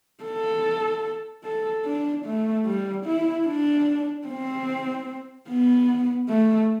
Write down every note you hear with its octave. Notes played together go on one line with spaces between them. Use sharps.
A4
A4
D4
A3
G3
E4
D4
C4
B3
A3